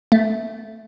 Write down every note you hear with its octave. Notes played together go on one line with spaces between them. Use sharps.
A3